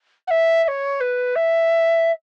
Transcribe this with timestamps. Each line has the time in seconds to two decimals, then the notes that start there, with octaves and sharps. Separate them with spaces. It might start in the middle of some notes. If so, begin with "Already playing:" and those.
0.27 F#5
0.31 E5
0.64 E5
0.68 C#5
1.01 B4
1.36 E5